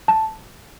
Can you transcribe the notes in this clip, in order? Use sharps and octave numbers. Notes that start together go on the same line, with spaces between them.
A5